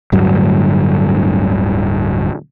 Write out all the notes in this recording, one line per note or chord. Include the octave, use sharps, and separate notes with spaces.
D1 D2 G2 F#3